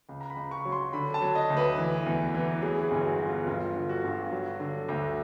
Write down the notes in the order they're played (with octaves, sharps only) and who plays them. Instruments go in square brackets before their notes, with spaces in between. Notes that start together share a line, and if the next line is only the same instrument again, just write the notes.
[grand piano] C#2
A#5
B5
C#2
C#6
F#3
C6
D3 B5
A5
F#3
D#5
D2
B4
E3
E2
E3
F#3 G#4
G#4
G1
F#4
F#3
F4
G1 F4
D3
F#4
G2
F#3
D3
D2